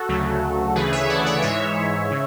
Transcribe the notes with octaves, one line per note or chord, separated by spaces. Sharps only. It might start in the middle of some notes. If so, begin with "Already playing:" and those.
Already playing: F#4 A4
D2 C#3 F#3 A3
D2 C#3 E3 A3 G#4 B4
C#5 E5
D5 F#5
C#5 E5
G#2 E3 G#3 C#5 E5
C#3